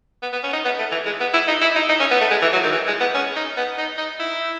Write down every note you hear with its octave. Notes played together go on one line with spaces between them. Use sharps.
B3
B3
C#4
D#4
B3
A3
E3
G#3
B3
E4
D#4
E4
D#4
D#4
C#4
B3
A3
G#3
E3
F#3
D#3
E3
G#3
B3
C#4
D#4
B3
D#4
D#4
E4